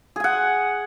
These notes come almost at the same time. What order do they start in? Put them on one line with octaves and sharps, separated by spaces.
G#4 G#5 F#5